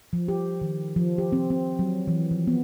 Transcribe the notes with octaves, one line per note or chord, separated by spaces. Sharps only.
F3
G4
D#3
F3
G4
C4
C4
F#3
E3
F3
B3